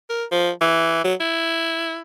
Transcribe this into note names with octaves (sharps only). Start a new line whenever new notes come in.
A#4
F3
E3
F#3
E4